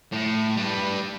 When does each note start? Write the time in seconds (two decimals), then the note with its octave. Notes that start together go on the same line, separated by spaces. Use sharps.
0.12 A2
0.57 G3 B4